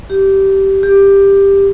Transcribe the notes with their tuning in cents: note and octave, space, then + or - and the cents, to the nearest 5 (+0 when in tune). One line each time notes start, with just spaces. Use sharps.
G4 -15
G4 +10